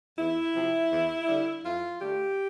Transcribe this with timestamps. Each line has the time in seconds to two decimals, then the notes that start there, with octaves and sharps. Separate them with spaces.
0.18 E2 E4
0.54 C3 F3
0.91 E2
1.27 D3 G3
1.64 F2 F4
2.00 D3 A3 G4